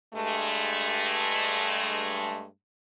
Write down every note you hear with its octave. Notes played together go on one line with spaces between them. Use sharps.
G2 G#3 A3